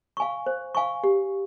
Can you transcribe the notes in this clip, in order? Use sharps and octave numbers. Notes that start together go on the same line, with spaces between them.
F5 G#5 C#6
C5
F5 G#5 C#6
G4